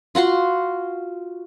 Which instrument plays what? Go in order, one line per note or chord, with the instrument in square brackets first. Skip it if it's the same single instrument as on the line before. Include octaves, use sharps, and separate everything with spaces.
[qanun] F4 F#4 F#5 C6